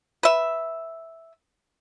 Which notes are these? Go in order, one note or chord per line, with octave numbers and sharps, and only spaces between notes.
B4 E5